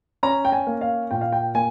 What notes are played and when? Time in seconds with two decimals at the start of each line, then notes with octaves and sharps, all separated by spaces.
0.23 C#4 A#5
0.45 G5
0.52 G#5
0.67 A#3
0.81 F5
1.11 A#2 G5
1.21 F5
1.32 G5
1.55 A#3 G#5